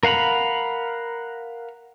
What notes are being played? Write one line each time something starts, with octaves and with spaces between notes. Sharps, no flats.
A#4 F5 F#5 A#5 B5